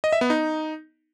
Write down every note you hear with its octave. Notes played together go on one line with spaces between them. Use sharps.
D#5
E5
B3
D#4